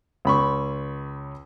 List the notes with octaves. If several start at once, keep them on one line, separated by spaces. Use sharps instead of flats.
C#2 B5 C#6